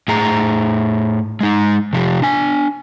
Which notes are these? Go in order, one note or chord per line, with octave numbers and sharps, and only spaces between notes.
A2 G#4 A#5
G#3 D#4
C3 F3 G4
D4 G#5